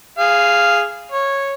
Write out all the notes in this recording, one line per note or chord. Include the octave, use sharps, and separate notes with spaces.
G#4 F5
C#5